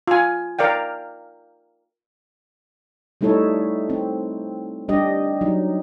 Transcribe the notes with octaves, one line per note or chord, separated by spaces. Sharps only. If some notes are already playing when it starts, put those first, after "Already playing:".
F4 G#5
A#4 D5 F5 G5
G3 A3 D#4 E4 A4 C#5
C4
G3 D4 G4 D#5
F#3 D#4